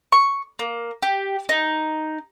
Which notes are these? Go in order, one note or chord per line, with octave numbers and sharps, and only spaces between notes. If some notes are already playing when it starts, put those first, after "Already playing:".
C#6
A#3
G4
D#4